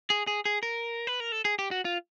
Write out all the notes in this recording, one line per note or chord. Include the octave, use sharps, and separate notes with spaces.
G#4
G#4
G#4
A#4
B4
A#4
A4
G#4
G4
F#4
F4